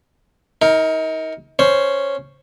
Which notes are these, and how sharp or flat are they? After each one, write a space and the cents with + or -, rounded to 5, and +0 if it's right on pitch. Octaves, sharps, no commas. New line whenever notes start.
D#4 +35 A#4 +0
C#4 +0 C5 +0